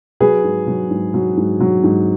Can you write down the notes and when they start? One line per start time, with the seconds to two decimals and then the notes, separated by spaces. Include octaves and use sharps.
0.20 F#3 G#4 B4
0.44 G#2
0.67 F#3
0.91 G#2
1.14 F#3
1.37 G#2
1.60 F#3
1.84 G#2